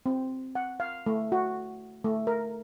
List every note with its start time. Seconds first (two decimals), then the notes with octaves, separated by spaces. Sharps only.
0.06 C4
0.55 F#5
0.80 F5
1.06 A3
1.32 F#4
2.04 A3
2.27 A#4